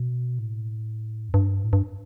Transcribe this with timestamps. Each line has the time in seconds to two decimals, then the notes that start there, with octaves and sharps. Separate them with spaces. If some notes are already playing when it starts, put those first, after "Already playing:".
Already playing: B2
0.39 A2
1.29 F2
1.34 G2
1.64 A2
1.73 G2